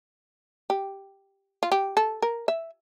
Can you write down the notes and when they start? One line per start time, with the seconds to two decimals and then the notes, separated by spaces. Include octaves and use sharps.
0.70 G4
1.63 F4
1.72 G4
1.97 A4
2.22 A#4
2.48 E5